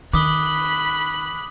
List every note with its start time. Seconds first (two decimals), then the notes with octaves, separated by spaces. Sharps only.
0.13 D#3 B5 D6 D#6 F#6 G7